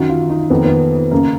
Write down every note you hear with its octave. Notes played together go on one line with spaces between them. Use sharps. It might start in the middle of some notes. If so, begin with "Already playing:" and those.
Already playing: F#2 D#3 F#4
F4
D#4
F2 D#3 B3
A#3
B3
F#2 C#3 A#3